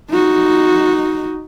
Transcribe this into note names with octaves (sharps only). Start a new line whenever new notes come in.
D#4 F#4